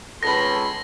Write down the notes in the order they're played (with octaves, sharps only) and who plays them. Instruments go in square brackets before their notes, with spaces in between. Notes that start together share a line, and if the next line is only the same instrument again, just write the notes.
[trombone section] C#2 A4 [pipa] B3 B4 [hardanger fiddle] B5 C6 [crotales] A#6